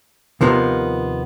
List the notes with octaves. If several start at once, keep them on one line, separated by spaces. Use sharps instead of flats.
D#2 C3 F3 A#3 B3